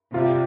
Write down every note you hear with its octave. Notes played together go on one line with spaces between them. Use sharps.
C3 G3 F4